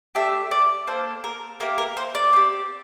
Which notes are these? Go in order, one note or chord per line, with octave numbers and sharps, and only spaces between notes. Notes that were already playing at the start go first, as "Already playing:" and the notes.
A3 D4 G4 E5
D5
A#3 D4 A4 C5
A#4
A#3 E4 G4 A#4
A#4
C5
D5
C4 G4